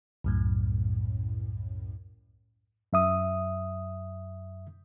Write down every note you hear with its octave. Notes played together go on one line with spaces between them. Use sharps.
C2 F#2 A2
F#2 E5 D#6